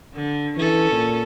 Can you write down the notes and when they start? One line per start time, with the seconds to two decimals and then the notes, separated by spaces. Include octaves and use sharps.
0.15 D3
0.57 E3 C#4 A4
0.92 A#2